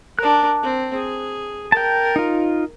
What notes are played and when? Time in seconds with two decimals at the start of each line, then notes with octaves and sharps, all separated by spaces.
0.19 D4 A#4 F#6
0.62 C4
0.94 G#4
1.72 A#4 G5 A5
2.16 D#4 F4